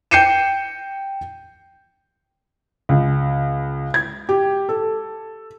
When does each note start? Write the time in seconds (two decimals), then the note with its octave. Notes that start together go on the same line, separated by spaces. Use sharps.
0.11 G5 G6 C7 C#7 D#7 E7
2.89 C#2
3.94 G#6
4.29 G4
4.69 A4